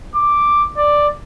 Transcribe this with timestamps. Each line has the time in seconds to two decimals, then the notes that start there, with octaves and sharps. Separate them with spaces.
0.15 D6
0.77 D5